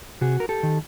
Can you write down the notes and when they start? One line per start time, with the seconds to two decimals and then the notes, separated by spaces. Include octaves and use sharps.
0.21 C3 F#4 G#4
0.40 A#4
0.49 G4 A4
0.63 D#3